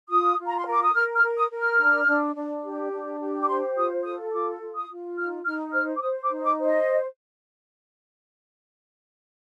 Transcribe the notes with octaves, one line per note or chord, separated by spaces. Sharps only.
F4 D#6
F4
A#5
C6
A#4 D6
D#6
A#4 F6
F6
A#4
D#6
A#4
F6
D4
D4
D4
G4
D4
G4
D6
C5 C6
F4 D#6
A4 D#6
F4 D6
F4
D#6
F4
D#4 F6
D#4 F6
C5 F6
D6
C5 D#6
D6
D#4
D6
C5
D#5